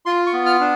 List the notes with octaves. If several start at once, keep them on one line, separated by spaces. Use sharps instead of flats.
F4 C6
C#6
B3
F6
D4